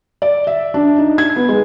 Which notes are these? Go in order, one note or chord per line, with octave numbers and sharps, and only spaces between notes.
D5
E5
D4
D#4
G#6
B3
G#3